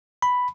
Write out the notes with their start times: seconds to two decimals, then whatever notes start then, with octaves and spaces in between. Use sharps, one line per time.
0.22 B5